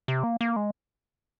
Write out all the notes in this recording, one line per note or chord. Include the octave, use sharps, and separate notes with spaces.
C3
A#3
A#3
G#3